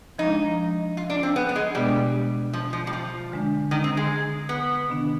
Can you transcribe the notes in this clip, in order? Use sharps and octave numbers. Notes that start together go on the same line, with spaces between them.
F3 G#3 D4 D#4
F4
D4
C4
B3
B3
G#3
B2 G3 G#3 B3 D4
F3
F3
G3
F3
D3 G#3 D4
D#3
C4
G#3
B3
C3 D#3 B3 D4